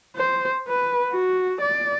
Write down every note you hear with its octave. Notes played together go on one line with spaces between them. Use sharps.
C5
B4
F#4
D5